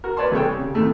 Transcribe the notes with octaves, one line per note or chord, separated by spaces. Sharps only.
F#4 A#4
B4 C#5 D5 A5 C6
C2 G#4 A4 C#5 G5
G3
C#3
D#2 A2 C3 D#3 A3 A5